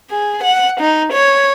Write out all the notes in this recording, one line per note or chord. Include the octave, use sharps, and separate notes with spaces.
G#4
F#5
D#4
C#5